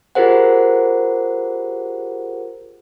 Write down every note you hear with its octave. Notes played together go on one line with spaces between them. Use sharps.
F4 G4 G#4 A#4 C5 F#5